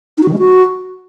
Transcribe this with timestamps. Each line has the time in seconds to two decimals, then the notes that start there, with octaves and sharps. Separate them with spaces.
0.17 D#4
0.22 F#4
0.28 D#3
0.33 G#3
0.38 F#4